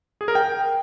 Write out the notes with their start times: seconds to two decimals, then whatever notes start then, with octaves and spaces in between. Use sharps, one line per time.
0.21 G#4
0.28 A#4
0.35 G5